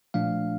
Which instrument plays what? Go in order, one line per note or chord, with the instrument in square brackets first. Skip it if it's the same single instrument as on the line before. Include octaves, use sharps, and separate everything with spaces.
[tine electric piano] A#2 F3 A3 D4 F5